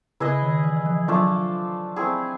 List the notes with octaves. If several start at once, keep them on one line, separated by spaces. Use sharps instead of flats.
C#3 E4 G#4 B4 D#5
D#3
E3
E3
F3
F3 F#3 A3 D4 F4
A3 C4 E4 G#4